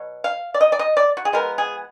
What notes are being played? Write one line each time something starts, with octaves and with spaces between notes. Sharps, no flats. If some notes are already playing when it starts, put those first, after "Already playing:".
Already playing: B2 F#3
F5
D5
D#5
D5
D#5
D5
F#4
G#4
F3 G#3 B3 A#4
G#4